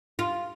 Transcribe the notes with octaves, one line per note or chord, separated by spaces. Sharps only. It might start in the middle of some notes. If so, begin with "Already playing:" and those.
F4